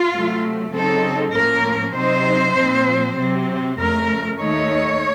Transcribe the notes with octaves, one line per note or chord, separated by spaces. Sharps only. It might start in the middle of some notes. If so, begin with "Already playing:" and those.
Already playing: F4
C3 F#3 A3
C#3 F#3 C4 D#4 A4
A2 F3 A#3 C#4 A#4
C3 F#3 C4 D#4 C5
A#2 F3 C4
C3 F#3 C4
F2 C#3 A3 A#4
D#2 D#3 A3 D#4 C#5